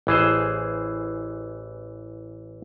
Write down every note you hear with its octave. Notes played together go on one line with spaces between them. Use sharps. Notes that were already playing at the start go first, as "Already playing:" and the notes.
A1 E3 G#4 C5